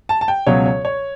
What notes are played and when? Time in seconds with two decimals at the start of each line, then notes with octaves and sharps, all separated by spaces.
0.09 A5
0.21 A5
0.28 G5
0.47 C#2 B2 F#3 C#4 C#5
0.66 C#5
0.85 C#5